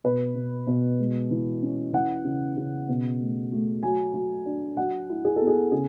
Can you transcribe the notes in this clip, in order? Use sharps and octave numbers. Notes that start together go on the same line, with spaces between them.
B2 B4
B2
B2
G#3
E3
C#4
E3 F#5
C#3
C#3
B2
A3
A3
F#3 G#5
F#3
D4
F#3 F#5
E4
G#4
B3 A4
G#4
C#3 G#4